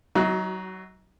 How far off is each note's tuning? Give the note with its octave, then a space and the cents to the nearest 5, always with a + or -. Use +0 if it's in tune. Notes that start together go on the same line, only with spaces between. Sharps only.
F#3 +25 D#4 +40 F#4 +0